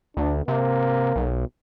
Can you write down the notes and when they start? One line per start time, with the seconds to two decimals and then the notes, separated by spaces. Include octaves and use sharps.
0.17 D2 D4
0.48 C3 A#3
1.16 B1